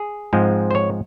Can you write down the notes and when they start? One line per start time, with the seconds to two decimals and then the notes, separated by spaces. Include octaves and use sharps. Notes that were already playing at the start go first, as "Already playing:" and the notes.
Already playing: G#4
0.33 G#2 F3 G#3 C4
0.71 C5
0.75 C#5